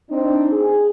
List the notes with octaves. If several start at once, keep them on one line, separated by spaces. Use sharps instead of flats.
C4 D4 D#4
G#4